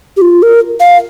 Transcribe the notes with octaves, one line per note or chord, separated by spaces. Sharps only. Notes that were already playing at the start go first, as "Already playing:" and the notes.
G4
F4
A#4
F5